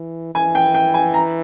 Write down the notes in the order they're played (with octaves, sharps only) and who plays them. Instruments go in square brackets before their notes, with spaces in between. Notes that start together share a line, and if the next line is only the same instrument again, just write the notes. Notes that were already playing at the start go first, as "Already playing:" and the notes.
Already playing: [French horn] E3
[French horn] E3 [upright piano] G#5
[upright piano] G5
G5
G#5
A#5